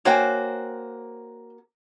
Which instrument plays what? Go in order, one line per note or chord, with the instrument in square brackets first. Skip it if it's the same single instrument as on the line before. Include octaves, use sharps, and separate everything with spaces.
[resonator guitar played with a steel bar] A#3 F#4 C5 [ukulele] C#5 G5 G#5